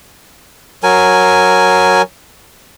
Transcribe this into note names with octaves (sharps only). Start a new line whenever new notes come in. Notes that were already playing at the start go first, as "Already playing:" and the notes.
F#3 A#4 G#5